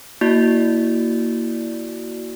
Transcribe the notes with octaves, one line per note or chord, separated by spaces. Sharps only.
A#3 E4 F#4 D5